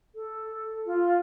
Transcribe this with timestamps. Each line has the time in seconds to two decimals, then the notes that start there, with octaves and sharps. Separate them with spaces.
0.15 A4
0.86 F4